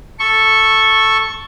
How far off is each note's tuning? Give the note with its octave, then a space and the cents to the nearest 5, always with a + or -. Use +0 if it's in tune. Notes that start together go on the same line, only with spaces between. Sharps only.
A4 +0 C#6 -10